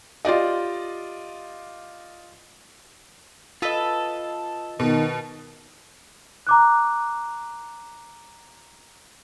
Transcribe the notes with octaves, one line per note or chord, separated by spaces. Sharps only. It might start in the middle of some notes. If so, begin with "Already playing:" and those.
F4 G4 D5 D#5
F4 A4 B4 D#5
B2 D#3
A#5 D6 F#6